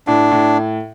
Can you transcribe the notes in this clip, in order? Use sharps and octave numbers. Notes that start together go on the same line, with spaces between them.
A2 D4
A2